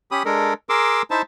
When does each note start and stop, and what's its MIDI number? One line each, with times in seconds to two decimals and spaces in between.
0.11 0.23 61
0.11 0.23 67
0.11 0.23 83
0.11 0.23 87
0.25 0.54 56
0.25 0.54 62
0.25 0.54 69
0.25 0.54 70
0.69 1.02 68
0.69 1.02 70
0.69 1.02 84
0.69 1.02 86
0.69 1.02 88
1.11 1.22 63
1.11 1.22 64
1.11 1.22 72
1.11 1.22 76
1.11 1.22 81